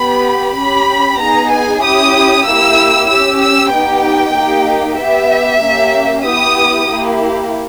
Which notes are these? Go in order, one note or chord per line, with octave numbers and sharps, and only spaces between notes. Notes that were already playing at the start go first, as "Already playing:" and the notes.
Already playing: B3 G4 B5
C#4 G4 B5
B3 D#4 G#4 A#5
G#5
C#4 E4 G4 D#6
A#3 E4 G4 E6
C#4 G4 E6
E6
B3 D#4 G4 G5
A#3 D#4 G4
B3 G4 E5
A#3 C#4 G4
B3 E4 G4 D#6
A#3 E4 G4